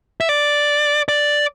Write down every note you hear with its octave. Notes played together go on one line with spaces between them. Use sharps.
E5
D5
D5